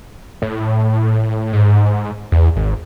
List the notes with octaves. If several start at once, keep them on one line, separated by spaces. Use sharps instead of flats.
A2
G#2
E2
G#1